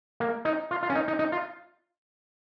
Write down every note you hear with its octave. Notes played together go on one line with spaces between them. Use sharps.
A#3
D#4
F4
F4
C#4
D#4
D#4
D#4
F4